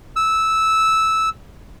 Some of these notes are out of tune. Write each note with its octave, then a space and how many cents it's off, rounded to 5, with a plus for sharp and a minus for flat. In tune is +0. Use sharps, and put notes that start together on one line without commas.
E6 -10